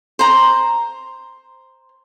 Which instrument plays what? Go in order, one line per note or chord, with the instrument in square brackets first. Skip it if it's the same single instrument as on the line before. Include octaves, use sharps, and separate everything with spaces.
[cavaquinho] C5 A#5